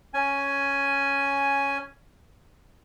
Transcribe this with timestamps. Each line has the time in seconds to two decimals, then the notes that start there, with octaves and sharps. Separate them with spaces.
0.14 C#4 G#5